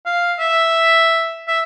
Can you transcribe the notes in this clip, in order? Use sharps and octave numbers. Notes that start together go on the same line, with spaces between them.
F5
E5
E5